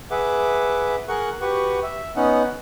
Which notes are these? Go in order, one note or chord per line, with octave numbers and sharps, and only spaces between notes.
G#4 B4 E5 F#5 D6
G#4 A#4 F#5 C#6 F#6
F#4 G4 B4 F#5 C#6
E5
B3 C#4 D#4 F#5